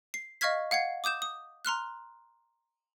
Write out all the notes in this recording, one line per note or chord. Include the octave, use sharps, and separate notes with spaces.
C7
D#5 F5 C#6 F6 G#6 B6
F5 F#5 G#6 C7
D6 D#6 G6 E7
D#6
A#5 C6 F6 F#6